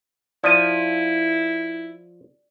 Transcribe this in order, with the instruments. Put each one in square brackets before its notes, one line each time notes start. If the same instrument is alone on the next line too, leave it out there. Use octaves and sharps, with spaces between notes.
[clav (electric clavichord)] F3 [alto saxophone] E4 [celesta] D5 D#7